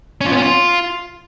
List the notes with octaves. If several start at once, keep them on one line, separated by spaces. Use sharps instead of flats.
C#4
F4
B3
C#4
F4